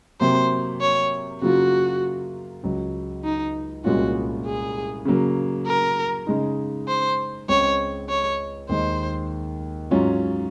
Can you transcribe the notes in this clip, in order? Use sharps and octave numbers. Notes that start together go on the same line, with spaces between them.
C3 F#3 A#3 C5
C#5
C#3 F#3 A#3 F4 F#4
C#2 C#3 F#3
D#4
C2 A#2 G#3 C#4 F4 F#4
G#4
C#3 F#3 A#3
A#4
C#3 G#3 D#4
C5
C#2 C#3 G#3 C4 C#5
C#5
D#2 D#3 G#3 C5
G#2 F#3 C#4 F4